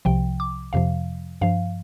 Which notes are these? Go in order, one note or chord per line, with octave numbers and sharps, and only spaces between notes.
C2 C3 F3 G5
D6
F2 C3 F3 F5
G2 F3 F5